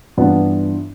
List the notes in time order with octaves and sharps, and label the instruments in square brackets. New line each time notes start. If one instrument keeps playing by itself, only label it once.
[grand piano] G2 E3 B3 D4 F4